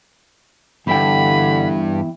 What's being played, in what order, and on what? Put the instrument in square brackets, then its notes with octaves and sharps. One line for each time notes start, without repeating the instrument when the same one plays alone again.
[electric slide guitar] E2 E4 G5 [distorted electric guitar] G2 [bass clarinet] D3 [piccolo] B5